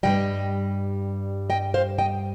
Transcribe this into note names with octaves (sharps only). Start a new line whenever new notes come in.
G2 D#3 G3 D#5 G5
D#5 G5
C5 F5
D#5 G5